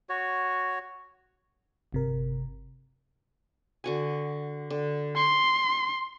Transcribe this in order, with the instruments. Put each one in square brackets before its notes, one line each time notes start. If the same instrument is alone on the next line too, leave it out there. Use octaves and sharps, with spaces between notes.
[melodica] F#4 C#5
[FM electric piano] G1 C3 A#4
[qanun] D3 F#4 G#5
D3
[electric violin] C6 [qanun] C#6